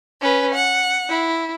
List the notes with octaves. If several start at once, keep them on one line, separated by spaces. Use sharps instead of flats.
C#4 B4
F#5
E4